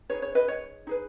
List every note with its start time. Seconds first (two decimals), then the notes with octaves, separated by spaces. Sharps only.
0.10 D#4 G#4 B4 C#5
0.22 C#5
0.35 B4 D#5
0.48 C#5
0.87 D#4 G#4 B4